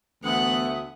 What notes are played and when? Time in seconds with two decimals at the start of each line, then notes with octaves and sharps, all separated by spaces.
0.23 D2 E3 A3 B3 E5 F#5 D#6